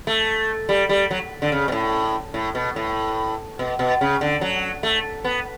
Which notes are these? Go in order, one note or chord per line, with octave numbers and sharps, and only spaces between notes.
A3
G3
G3
F#3
D3
C#3
B2
A2
A2
B2
A2
B2
B2
C#3
D3
F#3
A3
B3